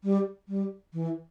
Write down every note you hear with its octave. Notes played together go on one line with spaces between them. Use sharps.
G3
G3
E3